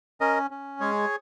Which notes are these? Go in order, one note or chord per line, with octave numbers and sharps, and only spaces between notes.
C#4 A#4 D#5
C#4
G#3 G#4 C#5